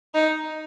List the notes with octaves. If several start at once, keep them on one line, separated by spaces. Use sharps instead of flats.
D#4